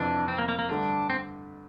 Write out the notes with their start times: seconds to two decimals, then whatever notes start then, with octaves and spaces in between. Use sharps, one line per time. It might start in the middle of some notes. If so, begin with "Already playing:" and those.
Already playing: F2 C3 E3 D4
0.28 C4
0.38 A#3
0.48 A#3
0.59 A#3
0.69 G2 D3 A3 D4
1.10 C4